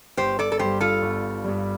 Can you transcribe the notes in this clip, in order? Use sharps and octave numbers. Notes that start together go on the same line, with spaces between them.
G1 G4 C5
A4 D5
A4
G2 G3 G4 C5
F4 A4
G1
G2 G3